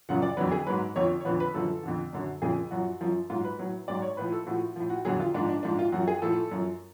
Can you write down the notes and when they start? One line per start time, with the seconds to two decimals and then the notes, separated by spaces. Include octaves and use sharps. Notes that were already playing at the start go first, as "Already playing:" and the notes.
0.09 F#2 C#3 F3 F#5
0.22 D5
0.37 F2 D3 F#3 B4
0.51 G#4
0.67 G#2 F#3 B4
0.96 F2 D3 F3 C#5
1.21 C#5
1.25 F2 D3 F3 B4
1.40 B4
1.54 F#2 D3 F3 A4
1.83 F2 D3 F3
2.13 F#2 D3 F#3
2.42 F2 C#3 F3 G#4
2.71 F#2 F3 F#4
3.01 F#2 F3
3.30 G#2 F#3 F4
3.44 B4
3.59 A2 F#3
3.88 G#2 F#3 D5
4.02 C#5
4.17 A2 F3 B4
4.32 A4
4.46 A2 F3 F#4
4.76 A2 F3
4.90 F#4
5.05 F2 D3 F#3 G#4
5.20 F4
5.34 G#2 F3 D4
5.49 D4
5.63 G#2 F3 D4
5.79 F4
5.92 F#2 F3 F#4
6.08 G#4
6.22 A2 F3 A4
6.52 F#2 F3